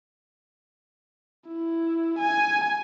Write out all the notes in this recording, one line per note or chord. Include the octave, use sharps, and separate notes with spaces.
E4
G#5